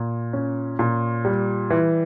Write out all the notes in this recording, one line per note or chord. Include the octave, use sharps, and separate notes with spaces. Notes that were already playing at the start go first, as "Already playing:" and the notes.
Already playing: A#2
C#4
A#2
G3
E3